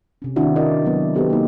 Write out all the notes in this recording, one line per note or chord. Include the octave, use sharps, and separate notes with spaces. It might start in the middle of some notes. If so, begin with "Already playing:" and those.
C3 C#4
D#3 C4 D4 E4 F#4
E4 A#4 D5 D#5
F#3 B3
B3 F#4 G4 A4 C5
A#3 D#4